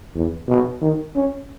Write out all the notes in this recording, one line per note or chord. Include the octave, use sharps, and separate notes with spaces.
E2
B2
D#3
C#4